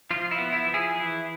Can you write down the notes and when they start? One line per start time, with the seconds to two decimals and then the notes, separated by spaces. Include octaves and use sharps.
0.11 F3 F4
0.31 E4
0.38 B3
0.52 E4
0.67 F3
0.74 E4 G#4
0.95 E3 E4